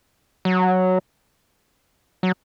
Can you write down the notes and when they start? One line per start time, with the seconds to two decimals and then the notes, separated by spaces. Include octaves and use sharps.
0.45 F#3
2.23 F#3